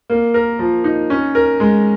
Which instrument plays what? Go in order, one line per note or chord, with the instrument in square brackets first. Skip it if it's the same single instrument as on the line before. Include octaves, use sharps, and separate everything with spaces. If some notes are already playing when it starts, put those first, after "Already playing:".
[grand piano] A#3
A#4
F3
D#4
C#4
A#4
G#3